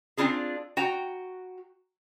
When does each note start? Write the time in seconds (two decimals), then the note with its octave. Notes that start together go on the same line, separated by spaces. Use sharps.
0.17 C4 D4 E4 F4 G#4
0.77 F#4 G5 A#5